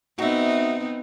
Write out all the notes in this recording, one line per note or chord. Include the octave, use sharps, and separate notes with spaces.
B3 C4 D#4 F#4 E5